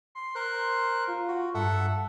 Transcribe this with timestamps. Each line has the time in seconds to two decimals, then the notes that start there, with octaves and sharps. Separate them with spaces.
0.15 C6
0.35 A#4 C5 F#6
1.07 F4
1.28 F#4
1.54 G2 A4 E5 F#5